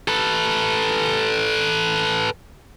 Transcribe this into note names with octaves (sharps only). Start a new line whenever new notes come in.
A4 B4